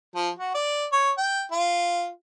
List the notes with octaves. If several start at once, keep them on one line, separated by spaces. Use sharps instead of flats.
F3
F#4
D5
C#5
G5
F4